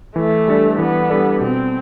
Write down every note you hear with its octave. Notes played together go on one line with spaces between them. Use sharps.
E3 A3
G3 D4 A4 D5
E3 B3
G3 D4 A4 D5
B2 C4